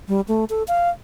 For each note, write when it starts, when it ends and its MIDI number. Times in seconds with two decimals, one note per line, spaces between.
0.08 0.21 55
0.28 0.45 57
0.50 0.63 69
0.68 0.89 77